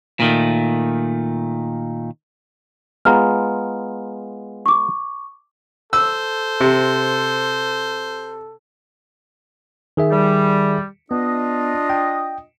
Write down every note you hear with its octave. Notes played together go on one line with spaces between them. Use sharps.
A#2 D#3 A3
G#3 B3 F4 A#5 F6
C#6 D6
A4 C5 E6
C3
D#3 G#4 E5
G3
B3 D4 F4 D#5
G5